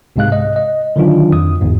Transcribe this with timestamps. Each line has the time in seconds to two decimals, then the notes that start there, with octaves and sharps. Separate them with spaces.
0.16 C2 G#2 C3 G#3 F5 F#6
0.32 D#5
0.56 D#5
0.96 D3 D#3 F#3 D4 F4
1.32 F2 D#6
1.61 G1 E2 G#2